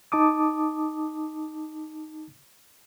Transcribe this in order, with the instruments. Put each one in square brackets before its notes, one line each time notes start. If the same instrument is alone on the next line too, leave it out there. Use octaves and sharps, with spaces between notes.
[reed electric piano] D#4 A5 D6 D#6